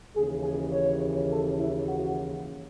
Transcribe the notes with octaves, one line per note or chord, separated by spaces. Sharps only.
D#2 C#3 E3 G#4
G#4
C#5
A4
E4
F#4